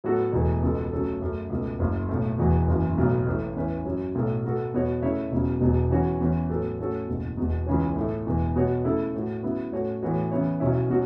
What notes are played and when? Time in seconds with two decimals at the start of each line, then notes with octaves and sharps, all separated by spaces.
0.04 A2 F#3 B3 F#4 A4
0.33 E1 E2 E3 A3 F#4
0.62 C#2 B2 B3 A4
0.92 C#3 F#3 A3 C#4 A4
1.21 F#2 C#3 A3
1.50 C#2 B2 A3
1.79 F#1 F#2 C#3
2.09 B1 A2 A3
2.39 E1 E2 E3 B3 F#4
2.67 F#1 F#2 E3
2.98 B1 A2 F#3 B3
3.26 A1 A2 A3 E4 B4
3.56 E2 E3 C#4 E4 B4
3.85 F#2 F#3 C#4
4.15 B1 A2 A3 F#4 A4
4.45 B2 B3 F#4 A4
4.74 E2 B2 B3 F#4 C#5
5.02 C#3 A3 E4 C#5 E5
5.32 E1 E2 C#3 F#3
5.61 E1 E2 B2 F#3
5.90 C#3 E3 C#4 F#4
6.20 E2 E3 C#4
6.50 A2 F#3 B3 A4
6.78 A2 A3 C#4 F#4 A4
7.08 F#1 E2 B2
7.37 E1 E2 B2
7.66 C#2 C#3 E3 C#4
7.96 A2 A3 E4
8.26 E1 E2 E3
8.56 B2 B3 F#4 C#5
8.84 C#3 A3 E4 A4
9.14 A2 A3 F#4
9.43 C#3 F#3 B3 E4
9.72 A2 A3 C#4 F#4 C#5
10.03 A2 E3 B3 F#4 C#5
10.31 C#3 E3 B3 E4 C#5
10.60 B1 B2 F#3 C#4 E4
10.90 B2 F#3 C#4 F#4